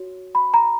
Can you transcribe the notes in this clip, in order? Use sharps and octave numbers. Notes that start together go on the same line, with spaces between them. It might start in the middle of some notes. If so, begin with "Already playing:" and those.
Already playing: F#4 C#5
B5
A#5